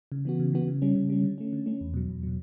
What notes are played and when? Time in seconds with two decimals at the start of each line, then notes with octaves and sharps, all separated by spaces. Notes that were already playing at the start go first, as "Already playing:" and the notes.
0.12 C#3
0.25 E3 B3 F#4
0.39 C#3
0.53 E3 B3 F#4
0.68 C#3
0.82 G3 C#4
0.95 C#3
1.09 G3 C#4
1.23 D3
1.38 A3 C#4
1.53 D3
1.66 A3 C#4
1.81 E2
1.94 B2 F#3
2.09 E2
2.23 B2 F#3